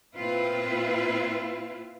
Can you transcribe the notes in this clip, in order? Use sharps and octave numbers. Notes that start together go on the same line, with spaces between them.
A#2 C4 E4 F4 B4